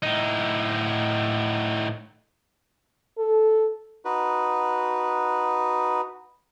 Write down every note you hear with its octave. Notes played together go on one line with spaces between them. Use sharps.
A2 D#4
A4
D#4 F#4 B4